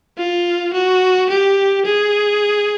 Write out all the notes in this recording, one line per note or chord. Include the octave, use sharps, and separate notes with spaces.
F4
F#4
G4
G#4